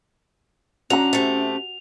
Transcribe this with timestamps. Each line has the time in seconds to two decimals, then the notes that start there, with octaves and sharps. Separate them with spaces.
0.90 D3 C#4 F#4 A#5 F7
1.13 C3 A3